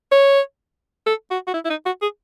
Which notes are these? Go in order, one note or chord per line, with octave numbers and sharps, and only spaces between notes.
C#5
A4
F#4
F#4
E4
E4
D#4
F#4
G#4